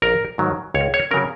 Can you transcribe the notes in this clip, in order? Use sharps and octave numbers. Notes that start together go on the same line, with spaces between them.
A#1 A#4
G#2 D#3 F#3
C#2 C#5
C#5
C#3 F#3 C#4 A#4